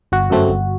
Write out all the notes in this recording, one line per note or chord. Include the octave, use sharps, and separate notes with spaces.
G1 F#4
F#2 F#3 A3 C4
G1